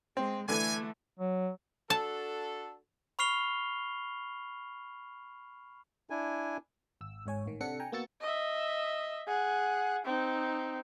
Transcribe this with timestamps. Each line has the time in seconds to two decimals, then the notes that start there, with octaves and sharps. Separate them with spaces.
0.17 G#3 C4
0.49 D3 E3 A3 G#5
1.19 F#3
1.90 D4 F#4 A4 A5
3.19 B5 C#6 F6 C7 F7 G7
6.10 D4 E4 G#5
7.01 G#1 E6
7.26 G#1 G#2 C#5 G#5
7.46 A1 D#3
7.60 C3 D4 A4 F#5 C#7
7.80 G5 G#5 A#5
7.92 A#3 B3 F#4 E6 A6 C#7
8.21 D#5 E5
9.27 G#4 F#5
10.05 C4 D#4